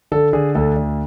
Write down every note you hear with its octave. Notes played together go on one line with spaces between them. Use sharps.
D3 A4
D3 G#4
D2 A4
D3